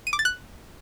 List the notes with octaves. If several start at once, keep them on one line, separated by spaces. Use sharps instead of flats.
D#7
D6
A6
F#6